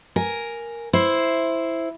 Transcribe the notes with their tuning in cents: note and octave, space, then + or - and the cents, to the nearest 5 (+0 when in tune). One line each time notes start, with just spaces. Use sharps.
A#4 +0 G#5 +0
E4 +0 C5 +0